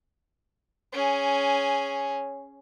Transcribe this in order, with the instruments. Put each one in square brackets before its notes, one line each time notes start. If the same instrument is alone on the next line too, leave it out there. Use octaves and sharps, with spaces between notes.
[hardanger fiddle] C#4 G#4